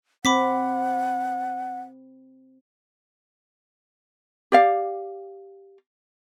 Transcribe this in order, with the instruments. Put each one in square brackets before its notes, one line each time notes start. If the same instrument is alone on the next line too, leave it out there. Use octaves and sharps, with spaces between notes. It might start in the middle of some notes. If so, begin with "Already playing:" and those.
[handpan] C4 [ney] F#5 [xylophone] B5 D6 B6
[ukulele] G4 D5 F5